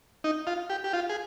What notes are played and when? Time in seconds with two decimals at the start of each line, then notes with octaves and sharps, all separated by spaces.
0.24 D#4
0.47 F4
0.70 G4
0.84 G4
0.93 F4
1.09 G#4